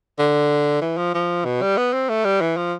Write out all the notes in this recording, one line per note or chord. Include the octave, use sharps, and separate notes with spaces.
D3
E3
F3
F3
B2
G3
B3
C4
A3
G3
E3
F3